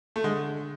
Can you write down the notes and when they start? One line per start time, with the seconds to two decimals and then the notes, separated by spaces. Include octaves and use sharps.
0.16 A3
0.24 D3 G#3